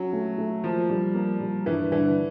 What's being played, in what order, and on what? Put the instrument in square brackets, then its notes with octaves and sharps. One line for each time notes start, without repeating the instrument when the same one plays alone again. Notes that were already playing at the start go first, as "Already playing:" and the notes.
Already playing: [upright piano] F#3 [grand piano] C#4
[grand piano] A3
A3
[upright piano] F3 [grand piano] A#3
[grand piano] G3
A#3
G3
[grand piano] G2 [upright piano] E3
[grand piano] D3 [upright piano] E3